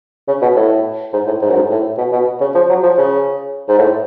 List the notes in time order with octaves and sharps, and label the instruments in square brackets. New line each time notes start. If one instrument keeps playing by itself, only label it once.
[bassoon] C#3
B2
A2
G#2
A2
G#2
F#2
G#2
A2
B2
B2
C#3
F3
F#3
F3
C#3
G#2
A2